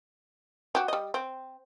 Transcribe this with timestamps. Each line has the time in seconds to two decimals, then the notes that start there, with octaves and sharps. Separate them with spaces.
0.75 F#4 G4
0.88 G3 D#5
1.14 C4